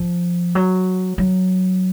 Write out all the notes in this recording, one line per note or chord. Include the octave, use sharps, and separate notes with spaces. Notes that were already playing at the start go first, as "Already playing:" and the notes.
Already playing: F3
F#3
F#3